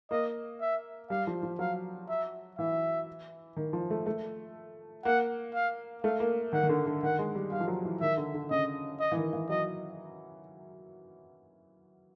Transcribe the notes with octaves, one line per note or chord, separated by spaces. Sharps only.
A#3 D#5
E5
G3 F5
F3
F3
F#3 F5
E5
E3 E5
D#3
F3
A3
A3
A#3 F#5
F5
A3 F5
A#3
D#3 F#5
D#3
D3
D3
D#3 F#5
G#3
G3
G3 F5
F3
F#3
E3
D#3 E5
D3
D3
C#3 D#5
D#5
E3
D#3
E3
F#3 D#5